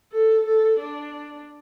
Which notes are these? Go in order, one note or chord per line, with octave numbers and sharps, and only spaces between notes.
A4
A4
D4